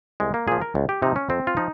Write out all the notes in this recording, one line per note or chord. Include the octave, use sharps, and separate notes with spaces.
C2 G#3
A#3
A#2 F3 G#4
A#4
C#2
G4
C3 F3 D#4
C#4
F2 C4
F4
F3 D#4